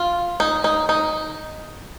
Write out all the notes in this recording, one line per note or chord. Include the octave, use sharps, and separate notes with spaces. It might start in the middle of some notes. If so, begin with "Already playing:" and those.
Already playing: F4
D#4
D#4
D#4